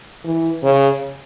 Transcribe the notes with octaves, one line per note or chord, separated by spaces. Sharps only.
E3
C#3